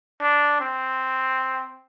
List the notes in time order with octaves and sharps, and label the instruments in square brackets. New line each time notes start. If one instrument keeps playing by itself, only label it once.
[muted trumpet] D4
C4